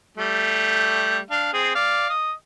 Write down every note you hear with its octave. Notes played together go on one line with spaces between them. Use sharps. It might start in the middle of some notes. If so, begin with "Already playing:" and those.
G3 A3
D4 F5
C4 G#4
D5 F5
D#5